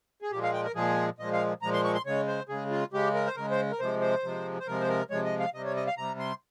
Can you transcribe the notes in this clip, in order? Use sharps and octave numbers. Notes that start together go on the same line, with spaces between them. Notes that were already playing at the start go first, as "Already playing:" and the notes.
G#4
A#2 F3 G#3 G4
F5
G5
A#4
A#2 F3 G#3 G#4
A#2 F3 G#3 D#5
F5
A#2 F3 G#3 A#5
C6
C#6
C6
C#3 G#3 C#5
C5
C#3 G#3 G#4
F4
C#3 G#3 G4
A#4
C5
C#3 G#3 A#4
C5
A#4
C3 F3 G#3 C5
C5
C3 F3 G#3
C5
C3 F3 G#3 A#4
C5
A#4
C3 F3 G#3 C#5
D#5
F5
C3 G3 D#5
C#5
D#5
F5
C3 G3 A#5
C6